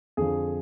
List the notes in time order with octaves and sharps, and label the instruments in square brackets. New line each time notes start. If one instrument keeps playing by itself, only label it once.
[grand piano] F2 D3 F3 G#4